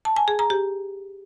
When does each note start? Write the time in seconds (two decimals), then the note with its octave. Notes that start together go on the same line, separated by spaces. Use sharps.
0.05 A5
0.16 G#5
0.28 G#4
0.39 A#5
0.50 G4